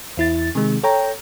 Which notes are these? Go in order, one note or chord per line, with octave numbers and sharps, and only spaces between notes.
E2 E4 A6
C3 D#3 G#3
A4 C#5 G5 A#5